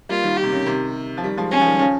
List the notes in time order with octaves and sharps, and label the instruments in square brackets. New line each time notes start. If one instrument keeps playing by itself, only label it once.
[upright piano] G3 A#3 [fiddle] F4
[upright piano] D#3 G3
[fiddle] G4
[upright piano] C3
C#3
C3 D#3
F3
D#3 G3
F3 G#3
[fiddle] C#4
[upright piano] F3
D#3 G3
C#3 F3